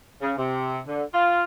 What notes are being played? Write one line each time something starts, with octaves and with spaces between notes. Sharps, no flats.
C#3
C3
D3
F4